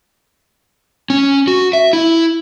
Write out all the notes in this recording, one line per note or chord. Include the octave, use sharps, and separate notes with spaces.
C#4
F#4
E5
E4